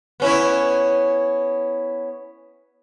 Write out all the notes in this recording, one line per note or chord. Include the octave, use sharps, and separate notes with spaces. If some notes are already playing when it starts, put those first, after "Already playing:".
B3 C#4 E4